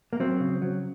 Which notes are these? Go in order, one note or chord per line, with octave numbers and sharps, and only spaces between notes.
A#3
F#3 C4
C#3
F#3